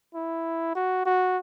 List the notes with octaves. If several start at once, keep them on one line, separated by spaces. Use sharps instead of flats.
E4
F#4
F#4